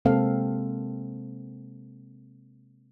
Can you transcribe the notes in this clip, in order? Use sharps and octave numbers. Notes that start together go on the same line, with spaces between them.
C3 G#3 A#3 C4 A4 F5